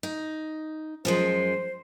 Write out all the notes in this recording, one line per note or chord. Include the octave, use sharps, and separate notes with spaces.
D#4
F#2 F3 G#3 C5